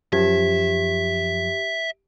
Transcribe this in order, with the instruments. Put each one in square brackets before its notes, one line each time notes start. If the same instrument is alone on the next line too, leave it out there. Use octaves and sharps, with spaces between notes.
[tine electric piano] F#2 F3 G#6 [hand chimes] G4 [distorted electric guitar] E5